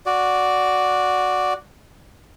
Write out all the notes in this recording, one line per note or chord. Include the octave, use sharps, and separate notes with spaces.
F#4 D5